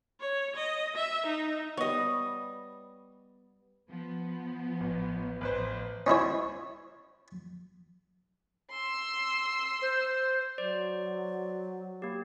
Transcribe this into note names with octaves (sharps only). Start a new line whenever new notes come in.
C#5
D#5
E5
D#4
G3 B3 C#5 D#5
F3 B3
A1
A1 B4 C5
C#4 D#4 E4 C#5
C6 E6
C5
F#3 C5 D5
A#3 G4